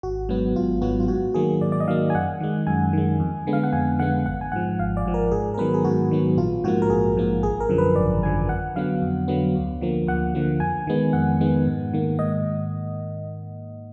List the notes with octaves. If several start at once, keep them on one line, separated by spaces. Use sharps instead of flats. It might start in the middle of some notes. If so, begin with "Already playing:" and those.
G#1 F#4
G#2 F#3 B3
G#1 F4
G#2 F#3 B3 F#4
F4
G#2 F#4
D#3 F#3 A#3 G#4
G#2 D5
D5
D#5
D#3 F#3 A#3 F5
G#5
F#2 F#5
D#3 G#3
F#2 G#5
D#3 G#3
F2
D3 G#3 B3
F5
F#5
F2 G#5
D3 G#3 B3 F#5
G#1 F#5
G#5
G#2 F3 F#5
G#1 F5
D5
G#2 F3
A#4
G#2 G#4
A#4
D#3 F#3 B3 B4
G#4
G#2 F#4
D#3 F#3 B3
A#1 F4
G#2 F3 A#3 F#4
A#4
A#1 G#4
G#2 F3 A#3
G#1 G#4
A#4
F#2 D3 F3
B4
G#1 D5
F#2 D3 F3 G#5
F2 F#5
D3 F#3 B3 F5
F2
D3 F#3 B3
D2
D3 F3 A#3
D2 F#5
D3 F3 A#3
F2 G#5
D#3 G#3 B3
F2 F#5
D#3 G#3 B3
G#2
D#3 A#3
G#2 D#5